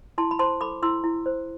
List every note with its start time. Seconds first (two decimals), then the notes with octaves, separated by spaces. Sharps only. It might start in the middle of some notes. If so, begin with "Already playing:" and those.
0.18 E4 A5 C6
0.31 B5
0.39 C5 A5 C6
0.61 A4 B5 D6
0.83 E4 C6 E6
1.04 E4
1.26 C5